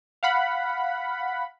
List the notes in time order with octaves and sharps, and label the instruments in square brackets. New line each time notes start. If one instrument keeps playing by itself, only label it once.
[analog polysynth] F5 F#5 B5